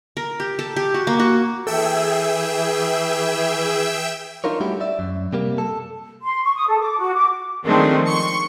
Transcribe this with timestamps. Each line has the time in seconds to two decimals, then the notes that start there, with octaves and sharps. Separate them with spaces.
0.17 A#4
0.40 G4
0.59 A4
0.76 G4
0.94 F#4
1.07 A#3
1.19 F#4
1.67 E3 G#4 A4 E5 G5 E6
4.44 D4 D#4 F4 A#4 C#5
4.60 G3 A3 C#4 E4 F#4 G4
4.80 D5 E5
4.99 F#2
5.33 C3 G3 A#3
5.58 A4
6.22 C6
6.42 C#6
6.55 D#6
6.68 A4
6.80 D6
6.98 F#4
7.15 D6
7.65 D#3 F3 G#3 A3 C4 D4
8.07 C6 C#6 C#7